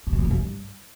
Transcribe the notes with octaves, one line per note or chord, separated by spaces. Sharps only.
G#2
A#2
C#3
F2
G2